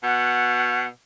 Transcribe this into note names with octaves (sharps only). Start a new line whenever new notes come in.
B2 F#5